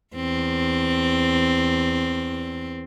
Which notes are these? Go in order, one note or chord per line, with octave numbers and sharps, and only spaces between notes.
E2 C4